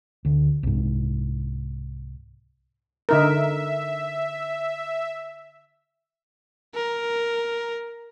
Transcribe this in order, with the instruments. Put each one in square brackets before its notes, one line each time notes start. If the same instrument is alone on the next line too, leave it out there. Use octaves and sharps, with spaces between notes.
[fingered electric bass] D2 D3
C2 G#2
[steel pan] D3 D#4 A#4 [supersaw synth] E5
[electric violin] A#4